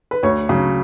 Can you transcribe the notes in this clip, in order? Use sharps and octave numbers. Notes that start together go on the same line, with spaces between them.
B4
D2 C#5
C#3 F#3